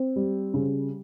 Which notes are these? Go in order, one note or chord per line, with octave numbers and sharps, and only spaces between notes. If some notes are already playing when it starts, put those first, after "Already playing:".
Already playing: C4
G3
C#3